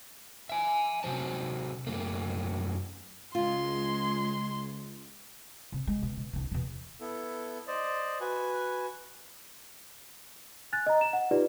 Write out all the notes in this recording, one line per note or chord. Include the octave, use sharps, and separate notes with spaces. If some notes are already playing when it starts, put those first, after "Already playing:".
E5 G#5
C3 F#3 C5 A5
F#2 A3 A#3
C#2 G#3 F4 C6
C3
G#3
B2
B2
C2 D3
E2 B2
B3 E4 A4
C5 D5 D#5
F#4 B4 G#5
G#5 F#6 A6
D#5 A#5
E7
F#5
D#4 F4 G4 B4 D5